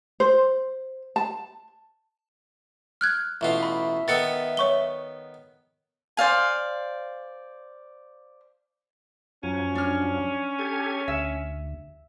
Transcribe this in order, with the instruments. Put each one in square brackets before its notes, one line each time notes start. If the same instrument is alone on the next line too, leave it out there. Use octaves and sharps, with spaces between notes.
[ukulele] C5
A5
[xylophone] F6 F#6 G#6
[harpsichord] A1 B2 F4 [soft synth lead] E5
[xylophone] B5
[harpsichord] D#3 B3 A4 [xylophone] A6 C#7
[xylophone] C#5 C#6 G7
[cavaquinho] C5 D5 F5 G#5
[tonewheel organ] F#2 F3 F#3 [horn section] C#4
[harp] D4 F6
[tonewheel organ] G4 A4 G#6
[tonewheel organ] D2 [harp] E5